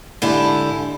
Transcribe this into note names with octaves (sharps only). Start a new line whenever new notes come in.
G#2 D3 E4 G4